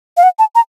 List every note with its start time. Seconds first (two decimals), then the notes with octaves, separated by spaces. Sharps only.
0.17 F5
0.23 F#5
0.39 A5
0.55 A#5